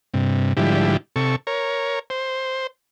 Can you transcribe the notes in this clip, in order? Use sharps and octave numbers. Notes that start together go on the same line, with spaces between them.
G2 C3
G#2 D3 F3 G3 E4 G4
C3 A4 C#6
A#4 C#5
C5